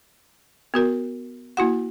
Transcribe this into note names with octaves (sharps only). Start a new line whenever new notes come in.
B3 F#4 A#4
A#3 E4 F#4 F#5